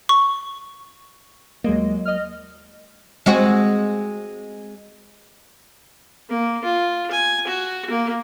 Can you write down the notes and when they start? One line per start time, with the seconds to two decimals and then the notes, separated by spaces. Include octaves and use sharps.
0.09 C#6
1.64 D#2 F#3 G#3 A#3 D#5
2.05 D#5 F6
3.26 G#3 C4 F#4
6.29 A#3
6.64 F4
7.11 G#5
7.47 F#4
7.90 A#3